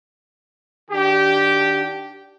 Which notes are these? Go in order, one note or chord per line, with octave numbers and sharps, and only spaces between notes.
D#3 D4 F#4 G4